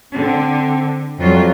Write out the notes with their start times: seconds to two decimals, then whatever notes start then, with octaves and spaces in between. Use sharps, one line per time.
0.12 D3 C4
1.18 F2 F#3 G3 F4